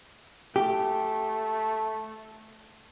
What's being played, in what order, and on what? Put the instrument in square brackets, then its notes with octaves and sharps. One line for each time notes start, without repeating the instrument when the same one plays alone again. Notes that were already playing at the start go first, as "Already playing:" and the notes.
[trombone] A3 [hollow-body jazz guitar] G4